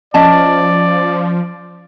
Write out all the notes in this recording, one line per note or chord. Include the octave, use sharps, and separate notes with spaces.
F3 C#4 D5 D#5 A5